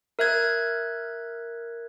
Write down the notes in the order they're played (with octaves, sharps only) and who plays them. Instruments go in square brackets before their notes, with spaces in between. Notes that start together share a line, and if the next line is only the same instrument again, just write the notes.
[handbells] A#4 E5 F#6 G#6